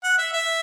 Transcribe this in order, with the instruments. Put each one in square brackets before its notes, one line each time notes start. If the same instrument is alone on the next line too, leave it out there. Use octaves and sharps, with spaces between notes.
[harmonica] F#5
E5
E5